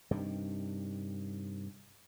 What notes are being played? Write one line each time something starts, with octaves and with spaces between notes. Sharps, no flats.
G2 C3 D#3